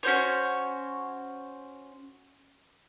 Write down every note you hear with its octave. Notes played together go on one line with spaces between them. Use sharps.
C#4 F#4 C5 C#5